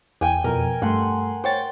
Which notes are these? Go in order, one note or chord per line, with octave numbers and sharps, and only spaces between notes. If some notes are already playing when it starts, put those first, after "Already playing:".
E2 G5 G#5
F2 B2 A#4
G2 A3 F#5 C6
C5 C#5 G5 A6